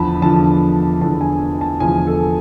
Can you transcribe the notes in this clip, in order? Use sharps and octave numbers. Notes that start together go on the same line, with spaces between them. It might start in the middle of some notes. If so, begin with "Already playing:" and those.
Already playing: E2 D3 F3 A5 B5
E2 D3 F3 A5
E2 D3 F3 A5
G#5
A5
E2 D3 F3 G#5
A4